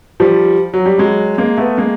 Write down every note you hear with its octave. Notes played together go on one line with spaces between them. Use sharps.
F3 G3
F#3
G3
F#3 G#3
G#3 A#3
A3 B3
G#3 A#3